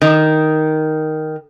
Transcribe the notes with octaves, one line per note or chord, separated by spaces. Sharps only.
D#3